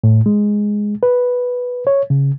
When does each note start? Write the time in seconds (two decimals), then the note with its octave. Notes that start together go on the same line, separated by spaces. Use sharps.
0.04 A2
0.26 G#3
1.03 B4
1.87 C#5
2.10 C#3